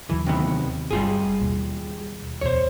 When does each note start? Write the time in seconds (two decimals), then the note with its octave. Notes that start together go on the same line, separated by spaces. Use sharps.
0.09 D#2 D3 E3 F#3
0.26 C3 D#3 B3
0.91 G1 G3 F4 G#4
1.41 D#2 B2 A#3
2.41 D1 E2 B2 C5 C#5